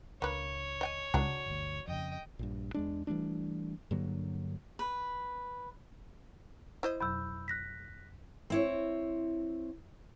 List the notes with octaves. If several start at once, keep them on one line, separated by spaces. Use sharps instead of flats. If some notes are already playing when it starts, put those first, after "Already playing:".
C#2 A#3 D4 B4 C#5
D#5 G5 G#5
C#2 F#3 D4 G#4
G1 D2
F2 C#3 D#5 G5
A#1 G2
E2 G#3 D4
E3 G3 A3 D4
G2 D3 F#3 A#3
B4
E4 C5 D#5
F2 B2 F#3 B5 E6 G6
F#6 A#6 B6
C4 E4 C#5